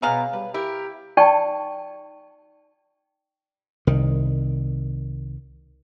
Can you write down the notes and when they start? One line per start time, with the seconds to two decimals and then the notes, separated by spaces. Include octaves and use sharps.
0.02 B2 F#3 B3 G#4 F5 A#5
0.33 G3 B4
0.54 E4 G4 A#4
1.17 D#4 D5 G5 A5 C#6
3.87 C2 D#3